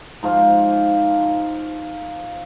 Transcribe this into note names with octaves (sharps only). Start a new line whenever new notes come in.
G#2 F3 F4 F5